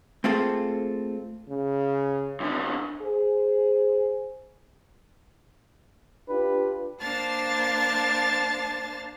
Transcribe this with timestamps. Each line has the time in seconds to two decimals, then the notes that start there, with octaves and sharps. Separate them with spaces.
0.24 A3 A#3 C4 F4 G#4 A4
1.49 C#3
2.40 F#2 D3
3.01 G#4 C5
6.29 D4 F4 G4 B4
7.00 A#3 D4 C5 A5 F6 A6